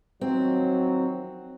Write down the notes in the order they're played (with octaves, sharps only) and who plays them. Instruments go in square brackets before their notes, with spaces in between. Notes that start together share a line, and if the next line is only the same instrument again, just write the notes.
[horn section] D#3 F3 F#3 [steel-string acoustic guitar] C4